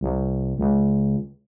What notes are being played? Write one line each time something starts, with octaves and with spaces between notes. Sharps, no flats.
C2
C#2